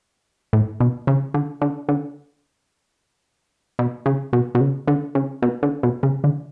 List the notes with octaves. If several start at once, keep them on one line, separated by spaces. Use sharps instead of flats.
A2
B2
C#3
D3
D3
D3
B2
C#3
B2
B2
C#3
D3
C#3
B2
D3
B2
C#3
D3